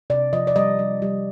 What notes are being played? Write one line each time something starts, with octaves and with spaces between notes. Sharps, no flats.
C3 D5
F3 D#5
D5
G3 D#5
G3
G3